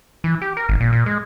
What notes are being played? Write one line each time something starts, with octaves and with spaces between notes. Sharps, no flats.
E3
G4
A#4
G#1
A#2
A#2
G#3